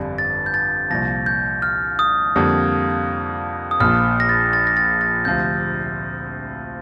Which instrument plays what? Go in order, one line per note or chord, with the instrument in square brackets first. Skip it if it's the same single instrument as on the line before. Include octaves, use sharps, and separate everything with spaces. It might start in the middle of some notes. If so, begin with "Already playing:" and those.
Already playing: [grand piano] G1 F2 D3 G3 D4
[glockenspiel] A6
G6
A6
[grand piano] C2 A#2 F3 [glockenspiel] A#6
[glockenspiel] G6
F6
D#6
[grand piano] F2 D3 G3 A#3
[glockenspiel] D#6
[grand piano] A#1 A#2 F3 [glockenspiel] F6
[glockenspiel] A#6
A6
A6
A#6
A6
A6
[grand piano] D2 C3 F3 C4 [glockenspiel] G6